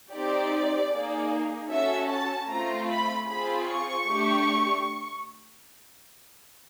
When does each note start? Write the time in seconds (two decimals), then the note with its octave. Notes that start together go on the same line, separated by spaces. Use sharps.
0.12 C4 D#4 G4 D5
0.91 A#3 D#4 G#4
1.70 C#4 F#4 A4 E5
2.09 A5
2.48 A3 C4 F4 A#5
2.88 B5
3.27 C4 F4 G#4 B5
3.67 C#6
4.07 A3 D4 G4